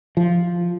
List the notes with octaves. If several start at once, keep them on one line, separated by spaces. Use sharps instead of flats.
F3